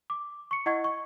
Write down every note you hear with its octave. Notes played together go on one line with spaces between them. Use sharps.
D6
C#6 C#7
E4 D#5 F#5 C#6 G#6
C#6